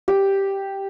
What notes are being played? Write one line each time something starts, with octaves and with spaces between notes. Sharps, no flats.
G4